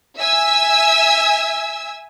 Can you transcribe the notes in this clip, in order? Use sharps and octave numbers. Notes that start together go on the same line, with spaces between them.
E5 G#5 E6